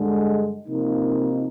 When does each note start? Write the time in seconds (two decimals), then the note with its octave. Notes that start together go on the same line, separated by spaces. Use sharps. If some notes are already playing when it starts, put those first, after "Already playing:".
Already playing: G2 D3 G#3
0.67 C3 F3 A#3 D#4